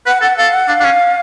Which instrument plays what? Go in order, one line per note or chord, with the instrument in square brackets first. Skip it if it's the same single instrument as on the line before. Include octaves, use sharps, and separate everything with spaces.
[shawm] B4 [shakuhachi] F#5
[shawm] A4 [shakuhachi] F#5
[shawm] A4 [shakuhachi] F5
[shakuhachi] F#5
[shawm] D4 [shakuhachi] F5
[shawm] D4
C#4